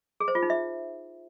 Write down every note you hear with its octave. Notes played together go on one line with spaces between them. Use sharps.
G#4
C5
F4
D#4
E5